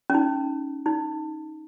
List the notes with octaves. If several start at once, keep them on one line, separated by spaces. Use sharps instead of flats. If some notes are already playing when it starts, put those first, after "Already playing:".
C#4
D#4
D#4